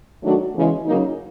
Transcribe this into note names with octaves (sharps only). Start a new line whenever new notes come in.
D#3 F#3 A3 D4 F#4
E2 C#3 E3 G#3
C#3 F#3 A#3 D#4